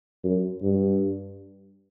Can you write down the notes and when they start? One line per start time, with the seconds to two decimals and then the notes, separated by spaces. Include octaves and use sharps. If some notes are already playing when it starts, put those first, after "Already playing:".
0.24 F#2
0.63 G2